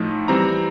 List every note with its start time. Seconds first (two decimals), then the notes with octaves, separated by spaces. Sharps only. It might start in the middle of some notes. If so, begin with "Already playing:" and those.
Already playing: A2 F3 A3 D#4
0.28 E3 G3 C4 A#5